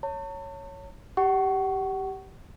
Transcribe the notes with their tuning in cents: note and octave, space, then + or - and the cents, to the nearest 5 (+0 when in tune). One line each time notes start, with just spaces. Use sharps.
C#5 +0 A5 +40
G4 -5 F#5 +35 C#6 +5